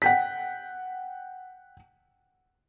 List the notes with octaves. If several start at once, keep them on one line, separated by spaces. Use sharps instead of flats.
F#5 G5 B6